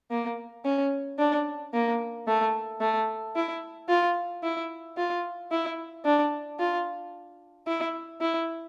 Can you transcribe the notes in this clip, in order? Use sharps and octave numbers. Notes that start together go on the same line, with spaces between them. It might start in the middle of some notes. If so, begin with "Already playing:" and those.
A#3
C#4
D4
A#3
A3
A3
E4
F4
E4
F4
E4
D4
F4
E4
E4